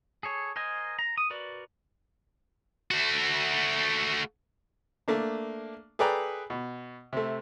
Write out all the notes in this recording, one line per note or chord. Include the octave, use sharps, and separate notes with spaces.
G#4 A4 C#5
A#4 C5 D#5 G#5
A#5
D#6
F#4 A#4 B4 D5
A3 F#4
A3 A#3 D4
G#4 A4 B4 D5 G5 A#5
B2
C3 A3